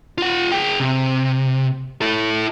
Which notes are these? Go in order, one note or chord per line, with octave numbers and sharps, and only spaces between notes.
F4 F#5
G#4 G5
C3
E4 A4